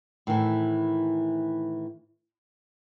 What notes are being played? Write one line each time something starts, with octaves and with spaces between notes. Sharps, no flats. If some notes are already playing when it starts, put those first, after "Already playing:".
A2 D#3 E3